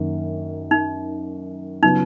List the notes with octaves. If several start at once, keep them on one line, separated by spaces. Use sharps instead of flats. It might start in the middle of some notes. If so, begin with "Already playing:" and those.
Already playing: F#2 D#3 A#3
D#4
C#3 F#3 B3 D#4 F4